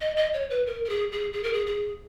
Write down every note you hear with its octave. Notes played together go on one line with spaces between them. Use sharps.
D#5
D#5
C#5
B4
A#4
A#4
G#4
G#4
G#4
A#4
G#4
G#4